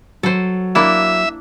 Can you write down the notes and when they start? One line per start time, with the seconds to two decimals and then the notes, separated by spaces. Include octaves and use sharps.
0.23 F#3 A4 C5
0.75 A#3 D4 E4 E5